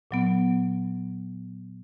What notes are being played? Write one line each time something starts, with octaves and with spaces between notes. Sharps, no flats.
A#2 F#3 B3